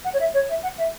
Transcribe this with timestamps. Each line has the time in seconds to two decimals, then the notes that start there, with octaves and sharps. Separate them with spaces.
0.04 F#5
0.13 C#5
0.19 E5
0.33 C#5
0.49 E5
0.62 F#5
0.77 E5